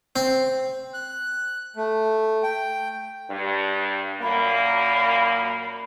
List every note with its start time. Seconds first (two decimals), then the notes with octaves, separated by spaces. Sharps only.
0.16 C4
0.94 F#6
1.76 A3
2.43 G5
3.31 G2
4.21 F#2 A#2 A#3 B5